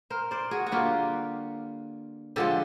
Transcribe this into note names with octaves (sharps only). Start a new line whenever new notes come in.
A#4 C5
C5 D5
F#4 G#4
F#4
D3 G3 A#3 F4 G4
D3 F3 G#3 G4 A4